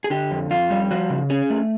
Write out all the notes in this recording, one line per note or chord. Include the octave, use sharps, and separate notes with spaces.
G#4
D3 G4
F2
F2 F4
G3
F3 F#4
C#3
C#4 G#4
A3